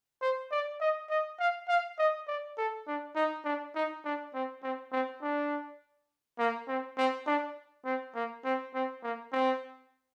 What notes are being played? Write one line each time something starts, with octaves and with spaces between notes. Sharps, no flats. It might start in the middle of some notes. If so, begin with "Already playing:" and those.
C5
D5
D#5
D#5
F5
F5
D#5
D5
A4
D4
D#4
D4
D#4
D4
C4
C4
C4
D4
A#3
C4
C4
D4
C4
A#3
C4
C4
A#3
C4